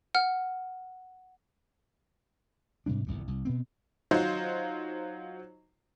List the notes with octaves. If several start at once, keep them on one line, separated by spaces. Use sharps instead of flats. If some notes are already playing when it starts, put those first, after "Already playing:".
F#5 F6
G#2 C3 G3 D4
G1 C2 F#2 A#2
C2
B2 B3 C4
F#3 D#4 F4 C5